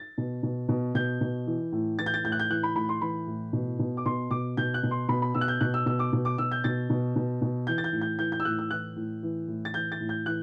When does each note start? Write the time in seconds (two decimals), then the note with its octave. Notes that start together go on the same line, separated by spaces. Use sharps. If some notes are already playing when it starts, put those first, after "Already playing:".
Already playing: A6
0.18 B2
0.43 B2
0.69 B2
0.95 B2 G6
1.21 B2
1.47 E3
1.72 A2
1.98 E3 A6
2.06 G6
2.14 A6
2.24 A2 G6
2.32 F#6
2.39 G6
2.50 E3 F#6
2.63 B5
2.75 A2 B5
2.89 C6
3.01 E3 B5
3.27 A2
3.53 B2
3.79 B2
3.97 D6
4.06 B2 C6
4.31 B2 D6
4.57 B2 G6
4.74 F#6
4.83 B2
4.91 C6
5.08 B2 B5
5.22 B5
5.34 B2 E6
5.41 F#6
5.48 G6
5.61 B2 F#6
5.74 E6
5.86 B2 E6
5.99 D6
6.13 B2
6.25 D6
6.38 B2 E6
6.51 G6
6.64 B2 A6
6.90 B2
7.16 B2
7.42 B2
7.67 E3 G6
7.78 A6
7.84 G6
7.93 A2
8.01 G6
8.19 E3 G6
8.32 G6
8.40 E6
8.45 A2 F#6
8.59 E6
8.71 E3 F#6
8.96 A2
9.23 E3
9.48 A2
9.65 A6
9.74 E3 G6
9.92 A6
10.01 A2
10.09 G6
10.26 E3 F#6